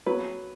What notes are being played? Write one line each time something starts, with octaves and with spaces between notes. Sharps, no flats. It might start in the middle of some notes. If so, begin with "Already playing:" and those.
F#3 B4